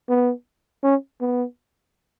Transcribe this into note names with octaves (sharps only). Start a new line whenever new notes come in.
B3
C#4
B3